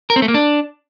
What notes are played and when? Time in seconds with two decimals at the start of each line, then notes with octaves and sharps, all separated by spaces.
0.10 A#4
0.16 C4
0.22 A3
0.28 A#3
0.34 D4